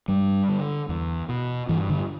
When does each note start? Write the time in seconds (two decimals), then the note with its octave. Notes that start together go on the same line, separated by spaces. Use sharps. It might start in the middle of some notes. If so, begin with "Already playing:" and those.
0.08 G2 G3
0.49 D3
0.89 E2
1.29 B2
1.69 G2 E3
1.90 D3